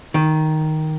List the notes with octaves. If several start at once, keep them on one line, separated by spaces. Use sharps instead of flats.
D#3